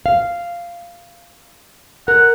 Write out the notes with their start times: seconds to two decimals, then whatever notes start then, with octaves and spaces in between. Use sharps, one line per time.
0.06 F5
2.08 A#4 F#5